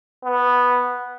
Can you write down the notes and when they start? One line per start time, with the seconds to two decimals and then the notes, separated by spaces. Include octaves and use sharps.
0.24 B3